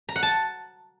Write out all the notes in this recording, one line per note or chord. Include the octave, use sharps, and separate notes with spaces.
A#5
F#5
A5